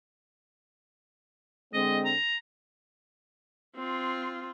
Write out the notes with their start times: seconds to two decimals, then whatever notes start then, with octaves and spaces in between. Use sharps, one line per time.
1.73 D3 G#3 C4 D#5
2.05 A#5
3.76 C4 F4